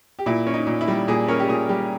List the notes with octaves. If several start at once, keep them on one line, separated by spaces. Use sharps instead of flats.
G4
A#2 E4
C#4
D#4
A#2
E4
G3
A#2 G#4
C#4 A#4
G4
A#2 G#4
G3 G4